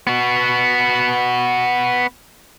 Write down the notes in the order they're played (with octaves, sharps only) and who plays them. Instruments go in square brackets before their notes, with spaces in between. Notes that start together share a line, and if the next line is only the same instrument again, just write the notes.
[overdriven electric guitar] B3 F#4